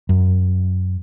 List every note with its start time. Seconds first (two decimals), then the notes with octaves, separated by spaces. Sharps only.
0.09 F#2